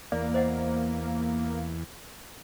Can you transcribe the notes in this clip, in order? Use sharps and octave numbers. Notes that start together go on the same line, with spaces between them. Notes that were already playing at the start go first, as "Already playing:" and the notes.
E2 A#3 D5
C5 D#5 F#5